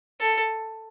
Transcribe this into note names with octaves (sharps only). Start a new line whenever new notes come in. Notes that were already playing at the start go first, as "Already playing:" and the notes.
A4